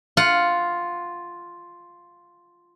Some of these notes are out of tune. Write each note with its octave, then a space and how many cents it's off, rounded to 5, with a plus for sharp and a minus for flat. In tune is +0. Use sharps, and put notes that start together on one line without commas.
F4 +0 F#5 +5